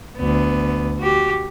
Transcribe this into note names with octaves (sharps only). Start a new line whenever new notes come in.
D2 B3
F#4 G4